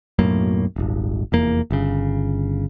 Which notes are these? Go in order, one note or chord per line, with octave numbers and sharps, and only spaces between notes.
B1 F#2 A2 A#3
D#1 G#1
F1 E2 A#3
G1 C#3